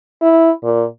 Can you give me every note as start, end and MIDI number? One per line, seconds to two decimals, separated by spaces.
0.22 0.50 64
0.63 0.84 46